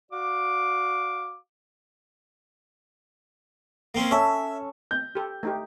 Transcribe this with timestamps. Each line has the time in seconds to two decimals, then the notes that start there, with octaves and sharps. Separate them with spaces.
0.12 F#4 D5 F5 D6
3.95 A#3 C4 C#4
4.11 C#4 A4 E5
4.91 G6
5.15 G4 A4
5.43 A3 D#4 G4